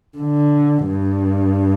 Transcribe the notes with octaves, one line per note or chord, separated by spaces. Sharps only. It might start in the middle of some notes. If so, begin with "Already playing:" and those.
D3
G2